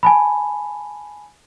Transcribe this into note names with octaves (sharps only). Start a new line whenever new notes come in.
G#5 A5 B5